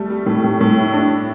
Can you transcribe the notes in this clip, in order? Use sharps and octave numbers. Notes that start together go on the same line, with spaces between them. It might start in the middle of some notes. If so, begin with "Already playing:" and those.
Already playing: G3 A3
G3
A2
A2
A2
E4
D4